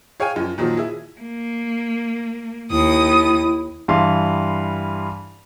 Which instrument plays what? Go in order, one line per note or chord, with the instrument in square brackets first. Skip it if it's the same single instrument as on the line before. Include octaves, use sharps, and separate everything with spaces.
[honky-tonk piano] G#4 C#5 F5 G5 G#5
F#2 F3
A#2 D#3 F3 F#3
E4 G#4
[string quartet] A#3
[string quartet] D#2 D#6 [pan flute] E4
[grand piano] G2 E3 F5 C6